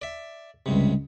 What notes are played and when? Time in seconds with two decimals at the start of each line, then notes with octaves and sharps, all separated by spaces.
0.02 D5 E5
0.66 C#2 G2 C3